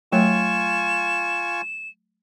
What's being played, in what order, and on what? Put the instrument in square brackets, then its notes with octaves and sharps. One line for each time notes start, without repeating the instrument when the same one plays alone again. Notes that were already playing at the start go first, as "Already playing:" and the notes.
[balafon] F#3 A3 C#5 [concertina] F4 G#5 C#6 [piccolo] E7